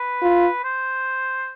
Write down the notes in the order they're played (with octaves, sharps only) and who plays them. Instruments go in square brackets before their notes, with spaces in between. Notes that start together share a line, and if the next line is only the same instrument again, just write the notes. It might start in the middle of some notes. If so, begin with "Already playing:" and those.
Already playing: [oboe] B4
[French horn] F4
[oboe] C5